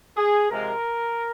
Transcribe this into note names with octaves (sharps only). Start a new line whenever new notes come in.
G#4
C3 F3 G#3 A#4